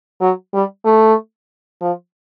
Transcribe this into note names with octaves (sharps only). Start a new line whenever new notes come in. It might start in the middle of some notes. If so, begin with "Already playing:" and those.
F#3
G3
A3
F3